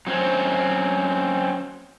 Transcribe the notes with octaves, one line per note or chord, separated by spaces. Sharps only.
F#3 C4 C#4